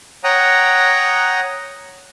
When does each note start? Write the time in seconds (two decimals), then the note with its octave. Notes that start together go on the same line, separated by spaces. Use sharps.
0.24 C#5 F#5 G5 A#5 D#6